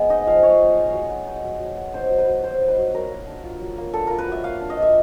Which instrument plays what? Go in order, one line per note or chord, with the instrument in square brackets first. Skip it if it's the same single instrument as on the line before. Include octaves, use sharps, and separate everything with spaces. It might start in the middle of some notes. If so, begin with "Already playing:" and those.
Already playing: [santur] G#3 B3
D#4 D#5
F3 F5
G#3 C#5
B3
D#4
F#3
B3
D#4
F#3
F#3
B3
D#4 C5
F#3
B4
F#3
B3 C5
D#4
B4
F#3
F#3 A#4
A#3
D4
F4
F#3
A#3
D4 A4
F4 A#4
B4
F#3 E5
A#3 F5
D4
D#5
F4
E5